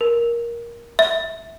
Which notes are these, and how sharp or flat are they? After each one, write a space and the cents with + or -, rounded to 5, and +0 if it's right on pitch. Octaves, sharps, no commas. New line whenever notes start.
A#4 +15
E5 -15